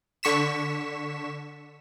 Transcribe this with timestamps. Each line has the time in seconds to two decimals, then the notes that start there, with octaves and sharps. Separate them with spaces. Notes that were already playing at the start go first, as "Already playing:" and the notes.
0.23 D3 C#6 B6 E7